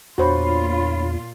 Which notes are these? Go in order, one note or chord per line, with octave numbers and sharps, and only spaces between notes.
E2 A#2 D4 F4 F#4 C5 C#5 B5